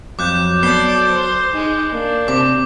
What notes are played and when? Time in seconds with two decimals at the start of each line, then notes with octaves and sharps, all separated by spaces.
0.19 F2 F#3 D6 F#6 G6
0.63 B3 A4 D5 G6 C7 G7
1.08 C5
1.54 G#3 D#4
1.93 A#3 D4
2.28 C3 D6